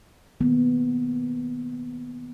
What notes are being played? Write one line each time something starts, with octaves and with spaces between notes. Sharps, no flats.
D#3 A#3 B3